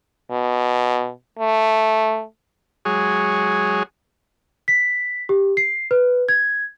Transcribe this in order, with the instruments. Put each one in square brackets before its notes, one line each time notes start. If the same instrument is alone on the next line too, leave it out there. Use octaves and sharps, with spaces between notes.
[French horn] B2
A3
[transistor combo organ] F#3 G#3 G#4 C#5
[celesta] B6
G4
C7
B4
G#6